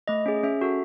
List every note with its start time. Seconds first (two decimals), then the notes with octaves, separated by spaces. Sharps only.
0.08 A3 D#5
0.26 C#4 G#4
0.43 C#4 E5
0.61 F#4 A4